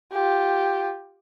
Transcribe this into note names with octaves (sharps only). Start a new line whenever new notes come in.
F4 G4